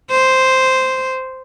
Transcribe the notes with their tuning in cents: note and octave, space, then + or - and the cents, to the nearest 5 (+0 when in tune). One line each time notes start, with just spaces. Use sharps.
C5 -5